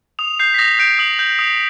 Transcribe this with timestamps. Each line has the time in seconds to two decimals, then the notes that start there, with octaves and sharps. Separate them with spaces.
0.19 D#6 F7
0.39 G6 C7
0.54 B6
0.59 D#6 A#6
0.79 G6 D7
0.99 D#6 F#7
1.19 G6
1.39 D#6